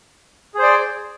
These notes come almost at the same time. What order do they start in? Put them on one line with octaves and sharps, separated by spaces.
G#4 C5 D5